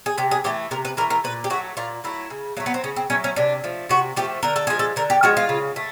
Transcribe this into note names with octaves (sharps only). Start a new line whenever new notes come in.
G#4
C3 G4
G#4
E3 A3 G4
C3 A#4
B4
E3 A3 A#4
A#4
A#2 B4
G4
F#3 A3 F#4
A#2 F4
F#3 A3 E4
C#3
F#3 A3 A#3
B3
C4
C#3 C#4
C4
F#3 A3 C#4
C#4
C3 D4
F3 A3
C3 F#4
F3 A3 G4
D3 A#4
A4
F3 G#3 G#4
A4
D3 A#4
G4
F3 G#3 F#4
F4
C#3
A3